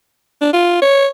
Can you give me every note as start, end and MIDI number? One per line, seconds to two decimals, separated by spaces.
0.42 0.53 62
0.53 0.81 65
0.82 1.07 73